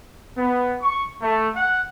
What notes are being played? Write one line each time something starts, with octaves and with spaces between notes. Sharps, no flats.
B3
C#6
A3
F#5